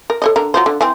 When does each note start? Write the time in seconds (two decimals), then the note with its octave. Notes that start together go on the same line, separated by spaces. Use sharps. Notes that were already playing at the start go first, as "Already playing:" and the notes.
0.10 A#4
0.22 A4 C#5 D#5
0.36 D3 A#4
0.54 F#3 F4 C5
0.66 D3
0.81 E3 C4